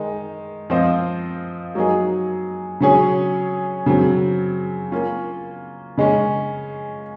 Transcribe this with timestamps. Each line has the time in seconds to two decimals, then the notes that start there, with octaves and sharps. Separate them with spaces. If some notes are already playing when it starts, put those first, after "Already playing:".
Already playing: D#3 G#3 D#4
0.70 F3 C4 F4 C5 D#5
1.75 F#3 A#3 D#4 G#4
2.80 C#3 F#3 C#4 G#4 C#5
3.86 C#3 F#3 C4
4.92 A#3 C#4 F4
5.98 C#3 G#3 C#4